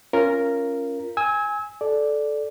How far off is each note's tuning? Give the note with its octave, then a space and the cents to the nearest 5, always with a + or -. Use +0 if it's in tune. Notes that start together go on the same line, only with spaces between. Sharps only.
C#4 +0 F4 -20 A#4 +0
G#5 +0 E6 -35
A4 -15 D5 +0